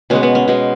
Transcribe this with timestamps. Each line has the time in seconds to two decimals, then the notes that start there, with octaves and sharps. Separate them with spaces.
0.10 B2 G#3 B3 C#4
0.23 B3
0.35 C#4
0.48 B2 G#3 B3